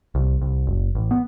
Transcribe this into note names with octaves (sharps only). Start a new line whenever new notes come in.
C2
C2
F#1
A1
B3